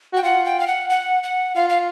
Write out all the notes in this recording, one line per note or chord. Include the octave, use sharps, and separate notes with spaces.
F#4 G5
F4 F#5
G5
F5
F#5
F#5
F#5
F4 F5
F5